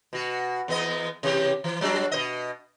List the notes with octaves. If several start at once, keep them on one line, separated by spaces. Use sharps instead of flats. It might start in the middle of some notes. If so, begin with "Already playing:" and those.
B2 F#4
E2 B3 D#5
C3 E3 G4
E3
F#3 G3 D4
B2 C5 D#5